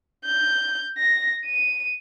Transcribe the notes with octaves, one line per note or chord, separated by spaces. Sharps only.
G6
A#6
D#7